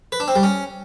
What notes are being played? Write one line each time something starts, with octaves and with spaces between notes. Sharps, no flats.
B4
D4
C4
G3
C#4